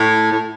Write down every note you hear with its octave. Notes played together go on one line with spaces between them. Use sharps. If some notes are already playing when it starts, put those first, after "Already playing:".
Already playing: A2
A2